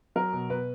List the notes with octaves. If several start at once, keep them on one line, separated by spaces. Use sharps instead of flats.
F#3 A#4
B2
B2 B4